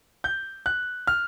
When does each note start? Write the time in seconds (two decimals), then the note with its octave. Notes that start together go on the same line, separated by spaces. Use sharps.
0.24 G6
0.66 F#6
1.07 F6